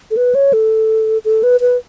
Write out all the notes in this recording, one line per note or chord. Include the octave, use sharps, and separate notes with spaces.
A4
B4
C#5
A4
A4
B4
B4